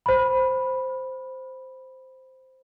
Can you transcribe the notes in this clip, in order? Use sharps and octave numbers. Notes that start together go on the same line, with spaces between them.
C5 B5